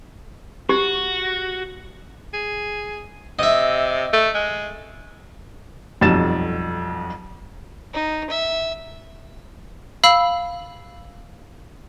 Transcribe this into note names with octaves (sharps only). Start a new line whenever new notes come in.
F#4 G4
G#4
C3 D#5 E5
A3
G#3
B1 F2 F#3 G3 A6 E7
D#4
E5
F5 B5 E6